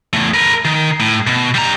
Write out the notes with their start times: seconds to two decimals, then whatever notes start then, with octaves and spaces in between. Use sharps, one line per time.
0.13 E2 A3
0.34 A#4 B4
0.65 D#3
1.00 A2
1.27 B2
1.54 G3 A#5